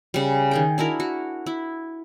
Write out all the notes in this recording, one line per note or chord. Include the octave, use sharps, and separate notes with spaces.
C#3 G3
D#3 G#4 G5
D4 E4 F#4 A#4
F#4
E4